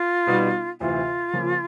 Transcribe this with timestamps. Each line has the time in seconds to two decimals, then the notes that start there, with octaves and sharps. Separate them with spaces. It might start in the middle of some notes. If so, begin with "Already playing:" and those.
Already playing: F4
0.27 B2 G3 B3 D#4
0.80 D2 C3 E3 F4
1.33 C#3 F3 A#3